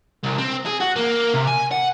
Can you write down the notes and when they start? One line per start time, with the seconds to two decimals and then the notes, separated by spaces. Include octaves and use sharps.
0.23 C2
0.38 C4
0.66 G#4
0.80 F#4
0.96 A#3
1.34 C3
1.47 G#5
1.71 F#5